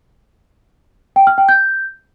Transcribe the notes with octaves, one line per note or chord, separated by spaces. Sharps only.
G5
F6
G5
G6